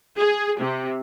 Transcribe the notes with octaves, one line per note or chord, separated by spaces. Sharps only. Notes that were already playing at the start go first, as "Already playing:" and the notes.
G#4
C3